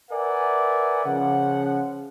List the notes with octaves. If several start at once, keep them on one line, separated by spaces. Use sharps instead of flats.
A#4 B4 D5 E5 F#5 G#5
C#3 F3 F#5